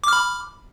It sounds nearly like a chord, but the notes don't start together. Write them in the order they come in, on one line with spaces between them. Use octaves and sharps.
D6 F6 B5